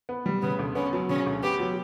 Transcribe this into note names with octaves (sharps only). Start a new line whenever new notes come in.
B3
G3
C#3 B3
D2
B3 C#4
F#3
C#3 C#4
D2
B3 G4
F#3